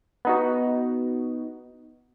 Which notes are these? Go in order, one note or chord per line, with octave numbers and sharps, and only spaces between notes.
B3 D#4 F#4